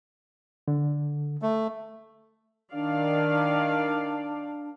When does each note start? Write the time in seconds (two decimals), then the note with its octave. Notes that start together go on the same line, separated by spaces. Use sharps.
0.68 D3
1.42 A3
2.73 D#3 D4 D5 F5